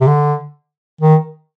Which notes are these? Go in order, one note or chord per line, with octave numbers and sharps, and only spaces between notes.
C3
D3
D#3